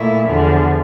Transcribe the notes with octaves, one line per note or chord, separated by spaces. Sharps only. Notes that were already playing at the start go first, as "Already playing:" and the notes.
Already playing: A#2 A3 E4
E2 D3 F3